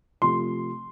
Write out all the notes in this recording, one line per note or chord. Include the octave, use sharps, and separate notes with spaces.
C3 F3 A3 C6